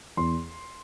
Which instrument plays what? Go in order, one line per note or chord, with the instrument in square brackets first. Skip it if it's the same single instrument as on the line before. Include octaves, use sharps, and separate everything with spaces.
[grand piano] E2 C6